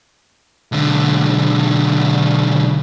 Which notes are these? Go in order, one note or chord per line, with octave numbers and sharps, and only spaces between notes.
B1 D3